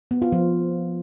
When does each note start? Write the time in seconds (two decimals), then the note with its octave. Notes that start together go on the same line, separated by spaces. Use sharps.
0.11 B3
0.22 F4
0.32 F3